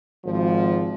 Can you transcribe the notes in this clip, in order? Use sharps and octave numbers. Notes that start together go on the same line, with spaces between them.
G#1 F3